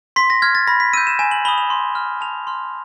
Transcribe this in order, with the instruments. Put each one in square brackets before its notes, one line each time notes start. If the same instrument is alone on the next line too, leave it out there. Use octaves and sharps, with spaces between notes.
[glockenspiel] C6 B6
A#6
F6 G#6
A6
B5 A#6
B6
E6 G6 D#7
E7
G#5 E7
F#7
B5 D#6 G7
F7
C6
F6
A5 F7
C6 F6